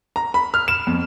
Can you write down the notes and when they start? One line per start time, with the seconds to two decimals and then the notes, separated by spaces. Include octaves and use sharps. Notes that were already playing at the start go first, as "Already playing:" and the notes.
0.16 A#5
0.34 B5
0.54 F6
0.68 E7
0.87 F2